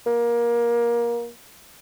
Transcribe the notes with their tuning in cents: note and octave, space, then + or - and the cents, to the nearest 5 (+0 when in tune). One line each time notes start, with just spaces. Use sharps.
A#3 +20